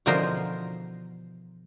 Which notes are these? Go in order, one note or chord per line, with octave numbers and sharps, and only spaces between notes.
B2 D3 E3 F3 A#4 C5